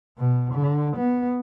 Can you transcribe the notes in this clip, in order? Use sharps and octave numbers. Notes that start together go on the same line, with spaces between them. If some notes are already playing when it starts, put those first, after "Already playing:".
B2
D3
B3